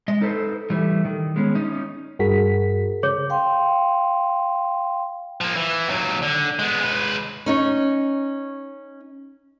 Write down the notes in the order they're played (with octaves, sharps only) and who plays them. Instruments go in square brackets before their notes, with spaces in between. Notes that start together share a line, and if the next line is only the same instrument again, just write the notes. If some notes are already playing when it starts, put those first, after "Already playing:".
[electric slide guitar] G#3 D#5
D#4 A4 B4 C5
E3 G3 A3
D#3
G#3 B3 C#4
C#4 D#4
[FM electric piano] G2 F#4 B6 [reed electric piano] G#4 A#4
[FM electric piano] C#3 [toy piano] G#4 C#5
[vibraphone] F5 G5 C6
[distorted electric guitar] F3 A#3
E3
D#2 F#3
D3
G#3 B3
G#3 B4
[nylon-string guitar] C#4 D#4 C#5